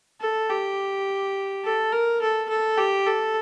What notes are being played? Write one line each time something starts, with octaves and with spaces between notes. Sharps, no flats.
A4
G4
A4
A#4
A4
A4
G4
A4